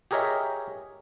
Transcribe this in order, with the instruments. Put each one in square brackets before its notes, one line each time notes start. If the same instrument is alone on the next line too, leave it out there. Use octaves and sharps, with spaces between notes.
[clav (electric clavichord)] G4 G#4 A#4 C#5 D#5 E5